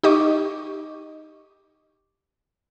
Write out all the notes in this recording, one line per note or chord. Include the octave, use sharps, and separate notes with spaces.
D#4 G4 D#5 C#6 D6